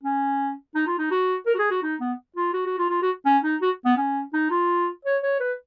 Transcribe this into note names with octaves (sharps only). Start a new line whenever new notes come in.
C#4
D#4
F4
D#4
F#4
A#4
F#4
G#4
F#4
D#4
B3
F4
F#4
F#4
F4
F4
F#4
C#4
D#4
F#4
B3
C#4
D#4
F4
C#5
C#5
B4